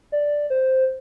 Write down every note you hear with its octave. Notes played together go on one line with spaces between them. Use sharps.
D5
C5